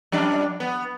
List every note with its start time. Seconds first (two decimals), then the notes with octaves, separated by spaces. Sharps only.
0.12 F2 G3 D4
0.60 B3